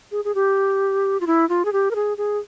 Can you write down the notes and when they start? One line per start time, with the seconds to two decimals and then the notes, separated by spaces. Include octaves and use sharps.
0.12 G#4
0.25 G#4
0.35 G4
1.21 F4
1.27 E4
1.49 F4
1.65 G#4
1.73 G4
1.91 A#4
1.95 G#4
2.18 G#4